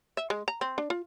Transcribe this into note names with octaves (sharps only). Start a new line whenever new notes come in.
E5
G#3
A#5
C4
D4
F4